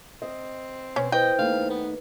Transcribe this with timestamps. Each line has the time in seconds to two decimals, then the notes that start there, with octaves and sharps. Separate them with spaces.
0.22 C4 D#5
0.96 B2 C#4
1.12 E4 B4 C5 D#5 G5
1.38 D#2 A3 D#4 F5
1.70 B3 B4